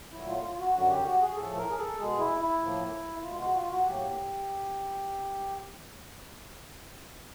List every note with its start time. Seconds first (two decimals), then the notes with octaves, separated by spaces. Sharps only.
0.13 A#2 F#3 A3 E4
0.28 F4
0.44 F4
0.59 F#4
0.74 F#2 D3 F#3 F#4
0.90 G4
1.06 F#4
1.22 G#4
1.36 A2 F3 A3 A4
1.57 A#4
1.70 G#4
1.78 A4
1.99 B2 G#3 G#4
2.19 E4
2.41 E4
2.62 A2 F3 A#3
3.23 B2 G#3 F4
3.39 F#4
3.54 F4
3.71 F#4
3.86 A2 F#3 A#3 G4